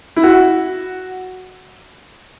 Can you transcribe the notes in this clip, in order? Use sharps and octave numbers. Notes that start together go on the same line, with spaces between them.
E4
F#4